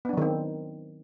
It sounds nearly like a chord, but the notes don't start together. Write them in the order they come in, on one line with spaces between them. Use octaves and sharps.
B3 D4 F#3 D#3 C4